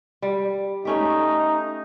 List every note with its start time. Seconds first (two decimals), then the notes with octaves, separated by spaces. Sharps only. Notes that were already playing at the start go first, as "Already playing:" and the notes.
0.22 G3
0.85 A3 C#4 D#4 G4